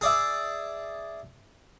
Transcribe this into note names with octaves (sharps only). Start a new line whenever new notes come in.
G#4 D5 E5